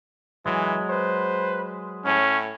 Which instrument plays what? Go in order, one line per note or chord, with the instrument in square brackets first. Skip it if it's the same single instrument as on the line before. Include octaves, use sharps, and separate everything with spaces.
[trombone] E3 [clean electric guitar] F#3 G#3
[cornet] B4 [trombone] C5
[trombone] A2 [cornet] C#4